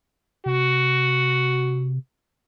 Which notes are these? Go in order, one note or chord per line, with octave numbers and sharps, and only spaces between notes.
C3 F#4